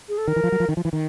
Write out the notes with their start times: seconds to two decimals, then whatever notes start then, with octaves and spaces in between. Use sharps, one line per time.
0.09 G#4
0.18 A4
0.28 D#3 A#4
0.36 E3
0.44 F3
0.52 F#3
0.60 F3
0.69 D#3
0.77 F3
0.85 E3
0.93 D#3